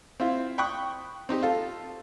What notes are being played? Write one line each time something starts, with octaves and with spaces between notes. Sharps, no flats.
C4 E4 F4
G5 B5 C#6 D#6 F#6
C4 D#4 G4
F4 A4